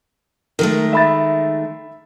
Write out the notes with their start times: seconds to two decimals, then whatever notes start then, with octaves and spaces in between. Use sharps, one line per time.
0.59 D#3 G#3 A3 A#4
0.93 E5 B5 A6